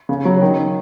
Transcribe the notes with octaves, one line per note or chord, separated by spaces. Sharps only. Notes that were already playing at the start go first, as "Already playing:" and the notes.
C#3
F#3
D#3